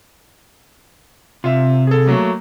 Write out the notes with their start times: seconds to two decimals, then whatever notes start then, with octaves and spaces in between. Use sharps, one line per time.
1.44 C3 F4 E5
1.87 G#4 A4
2.07 F#3 A3 A#3